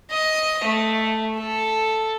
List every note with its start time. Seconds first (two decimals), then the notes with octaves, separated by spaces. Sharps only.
0.11 D#5
0.65 A3
1.38 A4